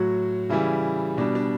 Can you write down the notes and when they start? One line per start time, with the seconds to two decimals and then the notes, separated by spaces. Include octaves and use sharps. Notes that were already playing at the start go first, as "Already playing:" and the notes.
Already playing: A2 F#3 F#4
0.49 C#3 E3 G3 E4
1.18 B2 G3 D4
1.35 D4